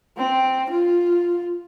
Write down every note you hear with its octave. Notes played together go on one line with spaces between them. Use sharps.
C4
F4